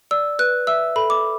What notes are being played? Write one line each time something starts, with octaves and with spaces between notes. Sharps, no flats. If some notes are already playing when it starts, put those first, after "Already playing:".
D5 E6
B4 F#6
E5 E6
A4 B5
D6